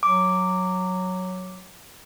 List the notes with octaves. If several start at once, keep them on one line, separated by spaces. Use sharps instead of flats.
F#3 D6